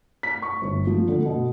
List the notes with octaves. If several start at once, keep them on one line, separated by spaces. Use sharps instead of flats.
B6
C#6
G1
F3
D3
B2